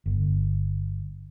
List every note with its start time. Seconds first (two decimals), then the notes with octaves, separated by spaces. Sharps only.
0.06 G1